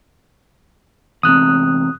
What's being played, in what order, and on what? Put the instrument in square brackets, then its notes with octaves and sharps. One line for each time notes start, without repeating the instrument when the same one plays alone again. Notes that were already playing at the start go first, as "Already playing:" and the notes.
[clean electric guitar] E2 C3 [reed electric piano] D#6 F#6